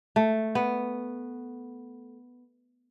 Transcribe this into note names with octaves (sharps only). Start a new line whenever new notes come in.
A3
B3